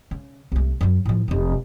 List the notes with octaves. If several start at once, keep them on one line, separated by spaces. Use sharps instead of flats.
C#3
C2 A3
F#2 F#3
A2 F3
F1 C#3